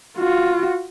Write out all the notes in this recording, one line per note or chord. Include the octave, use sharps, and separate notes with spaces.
F4 F#4